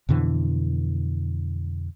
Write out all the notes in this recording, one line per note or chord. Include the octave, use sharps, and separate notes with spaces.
F2 B2 D3 E3